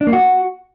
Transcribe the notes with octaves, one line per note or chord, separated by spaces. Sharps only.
D4
A#3
F#4